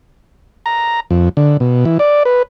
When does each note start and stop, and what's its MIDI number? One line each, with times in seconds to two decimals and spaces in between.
0.66 1.00 82
1.11 1.29 41
1.37 1.57 50
1.60 1.85 47
1.85 1.98 52
1.99 2.23 74
2.25 2.43 71